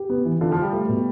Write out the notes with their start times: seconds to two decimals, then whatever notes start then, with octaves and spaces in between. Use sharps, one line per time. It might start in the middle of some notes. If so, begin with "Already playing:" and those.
Already playing: G4
0.10 B3
0.25 E3
0.41 D3 F4
0.52 F3 F4
0.62 G3
0.73 A3
0.89 B2